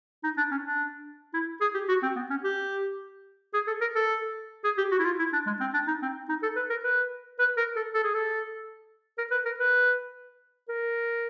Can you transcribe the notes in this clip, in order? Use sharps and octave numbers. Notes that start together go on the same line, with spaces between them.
D#4
D4
C#4
D4
E4
G#4
G4
F#4
C4
B3
C#4
G4
G#4
A4
A#4
A4
G#4
G4
F#4
E4
F4
E4
D4
G#3
C4
D4
D#4
C4
D#4
A4
B4
A#4
B4
B4
A#4
A4
A4
G#4
A4
A#4
B4
A#4
B4
A#4